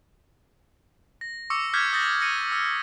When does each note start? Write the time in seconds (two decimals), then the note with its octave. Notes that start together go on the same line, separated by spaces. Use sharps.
1.21 A#6
1.50 C#6 D6 E6 C#7
1.73 D6 E6 F6 G6 G#6 B6
1.93 D#6 G6 A6 A#6
2.20 G6 A#6 C#7 D#7
2.52 E6